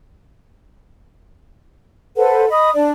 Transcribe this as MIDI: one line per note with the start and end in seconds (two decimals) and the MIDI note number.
2.17 2.47 69
2.17 2.47 71
2.17 2.47 72
2.17 2.47 78
2.49 2.70 75
2.49 2.70 83
2.49 2.70 87
2.74 2.91 62
2.74 2.91 74